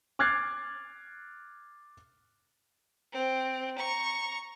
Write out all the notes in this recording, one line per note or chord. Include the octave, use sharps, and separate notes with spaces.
D6 F6 F#6 G#6 A6 C7
C4
A#5 C#6